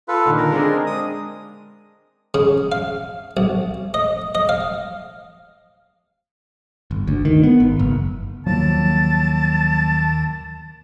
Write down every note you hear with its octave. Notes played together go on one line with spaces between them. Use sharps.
F4 A4 B4
A#2 D3 D#3
A#4
G#3 C4 D4
D#6
C#3
F5
B1
D#5
D#5
F5
G1
D2
D#3
B3
G#1
F#1
D#2 D#3 F3 F#3 A#3 A5 A6